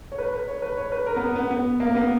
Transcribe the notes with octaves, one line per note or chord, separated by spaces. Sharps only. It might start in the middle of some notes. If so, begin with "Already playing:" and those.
C#5
B4
B4
C#5
B4
C#5
B4
A#4
B3
B3
B3
A#3
B3